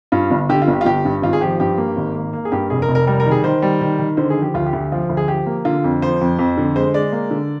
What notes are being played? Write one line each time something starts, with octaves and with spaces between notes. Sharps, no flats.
G2 F4
G1
D3 G4
F4
G1
G4
F4
G1 G4
G2
G#1 F4
G#4
F3 G4
G2 G4
A#3
G#1
A#3
A#3
G#4
G2 G4
F1 G#4
A#4
F1
A#4
G3 A#4
A#4
D#3
G#4
D#3 C5
G3
D#3
D#3
D3 C5
G#4
F3
G4
D2 F4
G4
D2
F3 F4
D2
G#4
F3 G4
A#3
D3 F4
F2
F3 C5
F2
F2
D3
G#3 C5
G#3 D5
A#3
D3